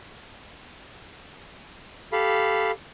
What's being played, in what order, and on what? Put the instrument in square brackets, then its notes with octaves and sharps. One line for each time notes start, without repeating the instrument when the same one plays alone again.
[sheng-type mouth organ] G4 A4 F5 B5